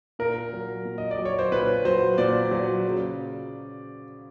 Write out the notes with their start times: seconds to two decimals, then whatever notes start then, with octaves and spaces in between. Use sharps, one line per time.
0.19 A#2 A#4
0.53 F#3
0.85 A#2
0.98 D#5
1.11 D5
1.19 F#3
1.25 C#5
1.39 C5
1.52 A#2 B4
1.85 F#3 C5
2.18 A#2 D5
2.51 F#3
2.84 C#3